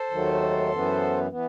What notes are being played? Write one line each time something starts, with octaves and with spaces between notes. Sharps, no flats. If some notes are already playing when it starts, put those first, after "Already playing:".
Already playing: A4 C5
D#2 D#3 F#3 A3
F#2 E3 B3
E3 B3